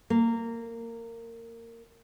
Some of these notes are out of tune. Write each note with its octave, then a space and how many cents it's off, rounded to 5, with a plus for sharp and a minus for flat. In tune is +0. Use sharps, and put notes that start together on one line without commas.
A#3 -20